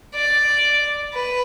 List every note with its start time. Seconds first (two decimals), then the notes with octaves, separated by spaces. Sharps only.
0.14 D5
1.14 B4